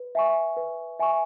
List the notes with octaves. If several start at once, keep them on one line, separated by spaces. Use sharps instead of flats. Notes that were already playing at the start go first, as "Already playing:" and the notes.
Already playing: B4
E5 G#5 C#6
B4
E5 G#5 C#6